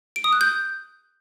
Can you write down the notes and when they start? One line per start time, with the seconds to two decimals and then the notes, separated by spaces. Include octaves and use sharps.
0.16 D7
0.24 D#6
0.33 F#6
0.41 G6